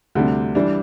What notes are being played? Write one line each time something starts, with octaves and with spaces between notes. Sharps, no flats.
D2 C3 G3 D4
E3 G3 D4